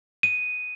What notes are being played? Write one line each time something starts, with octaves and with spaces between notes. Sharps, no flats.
D#7